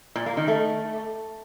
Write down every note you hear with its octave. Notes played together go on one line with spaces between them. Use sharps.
A#2
A#3
D#3
A3